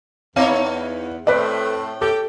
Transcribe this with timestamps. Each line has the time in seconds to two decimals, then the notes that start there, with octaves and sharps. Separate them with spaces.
0.36 E2 B3 D#4 C#5 F5
1.27 A2 A3 C4 B4 D5
2.02 G4 A4